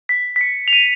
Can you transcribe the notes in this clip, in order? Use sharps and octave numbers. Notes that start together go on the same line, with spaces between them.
B6
B6
C#7
F7
D#7